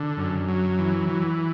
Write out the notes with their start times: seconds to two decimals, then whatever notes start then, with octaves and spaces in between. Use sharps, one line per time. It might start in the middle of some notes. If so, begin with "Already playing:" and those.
Already playing: D3
0.17 F#2
0.48 F#3
0.79 E3
1.10 E3